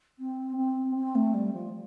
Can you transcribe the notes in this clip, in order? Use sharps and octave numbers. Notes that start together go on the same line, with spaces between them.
C4
C4
C4
A3
G3
F3